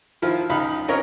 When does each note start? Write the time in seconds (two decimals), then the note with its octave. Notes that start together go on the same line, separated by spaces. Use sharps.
0.22 D#3 F3 E4 F4
0.50 C#2 D#4 F5 B5
0.88 C4 C#4 A#4 C#5 D#5